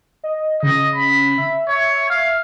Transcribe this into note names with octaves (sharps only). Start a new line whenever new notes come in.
D#5
C#3 D#5
B5
E5
C#5
F5